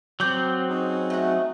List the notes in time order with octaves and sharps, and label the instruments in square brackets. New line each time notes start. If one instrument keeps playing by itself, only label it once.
[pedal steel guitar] F#3 C4 [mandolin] D6 G6
[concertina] C#4 D#4 G#4
[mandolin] A3 F#4